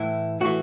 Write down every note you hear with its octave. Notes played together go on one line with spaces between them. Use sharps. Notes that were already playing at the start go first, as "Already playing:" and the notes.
Already playing: A2 E3 E4
A2 E3 F#4